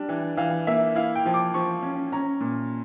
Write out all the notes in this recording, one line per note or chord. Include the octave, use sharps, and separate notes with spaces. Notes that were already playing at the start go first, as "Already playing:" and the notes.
Already playing: G3 D4
E3
E3 F5
A#3 E5
E4 F5
G5
F3
D6
F3 C#6
C#4
C#4 A#5
A#2